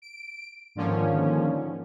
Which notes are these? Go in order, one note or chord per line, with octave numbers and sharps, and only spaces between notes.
D7
G#2 D3 D#3 F3 A#3 C#4